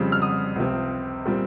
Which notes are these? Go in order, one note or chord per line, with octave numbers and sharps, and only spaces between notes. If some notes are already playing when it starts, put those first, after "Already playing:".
Already playing: F2 C#3 G3 C4
F6
D#6
C#2 C3 F3 C4
A#2 G3 C4